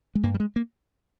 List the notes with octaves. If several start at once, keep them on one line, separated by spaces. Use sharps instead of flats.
G#3
G2 A#3
G3
G#3
A#3